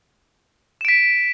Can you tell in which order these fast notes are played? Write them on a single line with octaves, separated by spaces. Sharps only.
E7 D7 B6